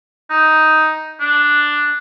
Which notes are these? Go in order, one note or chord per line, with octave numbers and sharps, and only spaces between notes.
D#4
D4